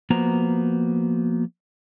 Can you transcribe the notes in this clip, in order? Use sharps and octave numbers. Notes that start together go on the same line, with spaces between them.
F3 A#3 B3 F#4 C5 A#5